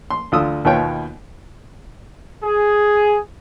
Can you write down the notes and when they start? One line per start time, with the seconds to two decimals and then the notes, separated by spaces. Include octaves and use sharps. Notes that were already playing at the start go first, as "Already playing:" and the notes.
0.10 C6
0.32 D2 F4 D#6 E6
0.65 D#2 B2 B3 F4 C#5 G5
2.44 G#4